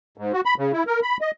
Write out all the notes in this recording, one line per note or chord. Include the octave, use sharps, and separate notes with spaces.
G#2
F#4
B5
C#3
E4
A#4
B5
D#5